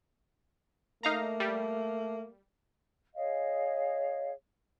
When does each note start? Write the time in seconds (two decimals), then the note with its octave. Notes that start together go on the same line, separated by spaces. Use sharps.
1.03 A3 A#3 D#4 F5 A#5
1.40 G3
3.15 G#4 C#5 D#5 F5